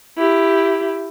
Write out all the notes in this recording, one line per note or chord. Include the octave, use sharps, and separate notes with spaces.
E4 G4